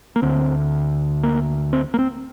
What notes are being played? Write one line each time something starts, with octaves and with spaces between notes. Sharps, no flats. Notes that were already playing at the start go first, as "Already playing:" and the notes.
A#3
D2 D3 C4
A#3
C4
A#3
C4